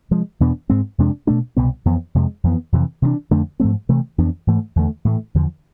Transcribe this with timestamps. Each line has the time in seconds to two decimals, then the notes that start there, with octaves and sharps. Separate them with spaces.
0.11 C3 F3 G#3
0.40 E2 B2 B3 D4
0.70 G#2 G#3 C4
0.98 F2 C3 G#3 D4
1.27 B2 A3 D4
1.57 C2 B2 B3
1.86 F2 E3 B3
2.15 F2 C3 G#3
2.44 F2 E3 B3
2.72 F2 C3 E3
3.02 C3 E3 A3 D4
3.31 F2 D3 A3 D4
3.60 G#2 F3 A3 C4
3.89 C3 E3 A3
4.18 F2 E3 B3 D4
4.47 G#2 E3 A3
4.76 E2 D3 A3
5.05 A2 E3 A3
5.35 E2 D3 F3